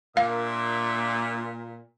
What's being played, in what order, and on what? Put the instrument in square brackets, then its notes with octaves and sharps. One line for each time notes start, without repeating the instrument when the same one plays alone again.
[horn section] A#2 [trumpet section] D4 E5 D6 [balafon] F5